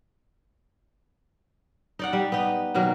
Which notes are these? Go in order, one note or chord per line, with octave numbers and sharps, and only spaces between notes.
D#4 D5 F#5
G3
B3 D#4
B2 D#3 F#3 A#3